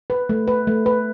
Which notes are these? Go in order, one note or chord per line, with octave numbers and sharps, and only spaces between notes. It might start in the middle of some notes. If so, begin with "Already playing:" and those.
B4
A3
B4
A3
B4